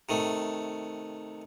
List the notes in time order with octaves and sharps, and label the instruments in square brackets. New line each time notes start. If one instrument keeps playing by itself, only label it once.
[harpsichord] C3 D#3 A3